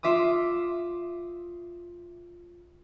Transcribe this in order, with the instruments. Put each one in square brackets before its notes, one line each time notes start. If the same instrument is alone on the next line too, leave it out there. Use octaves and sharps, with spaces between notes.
[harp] F4 E5 D6 D#6